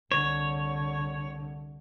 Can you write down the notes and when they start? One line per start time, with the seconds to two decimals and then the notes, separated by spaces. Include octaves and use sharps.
0.12 C2 D3 C#5